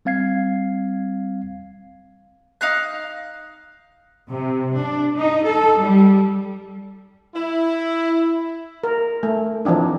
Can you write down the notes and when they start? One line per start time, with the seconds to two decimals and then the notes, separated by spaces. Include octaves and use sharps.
0.05 G3 C4 F5 G#6 C7
2.61 D#4 F5 F#6
4.29 C3
4.76 D4
5.17 D#4
5.46 A4
5.79 G3
7.36 E4
8.84 A#4
9.23 A3
9.65 E3 F3 C4 D4 D#4